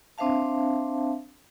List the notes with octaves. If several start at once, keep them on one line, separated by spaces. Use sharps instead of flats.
C4 D4 C5 E5 F5 A5